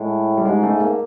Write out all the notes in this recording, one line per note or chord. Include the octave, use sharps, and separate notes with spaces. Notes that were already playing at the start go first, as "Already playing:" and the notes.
Already playing: A2 G#3
G3
G#2 G#3
A3
A#3